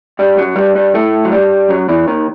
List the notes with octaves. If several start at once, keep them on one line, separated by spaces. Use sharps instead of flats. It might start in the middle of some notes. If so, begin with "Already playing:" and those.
G2 G3
F#2 F#3
G2 G3
G2 G3
A2 A3
F#3
G2 G3
F#2 F#3
E2 E3
D#2 D#3